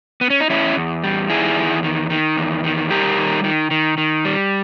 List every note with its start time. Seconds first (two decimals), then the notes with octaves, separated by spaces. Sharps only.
0.21 B3
0.30 C#4
0.40 D#4
0.50 E2 C#4 E4
0.76 E2
1.04 G3
1.30 D#3 E4 G#4
1.57 E2
1.83 D#3
2.10 D#3
2.37 E2
2.64 D#3
2.90 G3 G4 A#4
3.17 D#3
3.44 D#3
3.71 D#3
3.98 D#3
4.25 G3